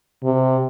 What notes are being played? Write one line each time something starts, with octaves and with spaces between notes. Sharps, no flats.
C3